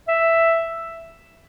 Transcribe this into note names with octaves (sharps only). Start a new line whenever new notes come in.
E5